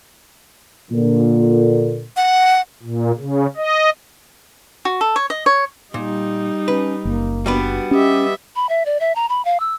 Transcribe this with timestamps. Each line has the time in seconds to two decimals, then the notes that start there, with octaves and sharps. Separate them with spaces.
0.91 A#2 D3
2.17 F#5
2.83 A#2
3.17 C#3
3.57 D#5
4.85 F#4
5.01 A4
5.16 C#5
5.30 D#5
5.46 C#5
5.94 A#2 G3 D#4
6.68 C#4 B4
7.05 F#1 A#3
7.46 G3 B3 D4 F#4 B4
7.91 C#4 G4 D#5 E5
8.56 B5
8.69 E5
8.86 D5
9.00 E5
9.16 A#5
9.29 B5
9.45 F5
9.60 E6